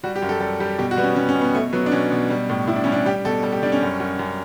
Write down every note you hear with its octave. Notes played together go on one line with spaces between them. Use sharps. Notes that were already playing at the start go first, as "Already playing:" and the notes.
G3 F#4
G4
F#2
A4
G3 A4
G3 G4
B2 G4
F#4
G3 B3
C#4
G3 C#4
C#4
B2
B3
B2 A3
F#3 B3
D4
B2 C#4
B2
G3
A2
A2 E4
D4
G3 C#4
D4
G3 G4
B2 A4
G3 A4
G4
G3 D4
C#4
F#2
F#2
F#2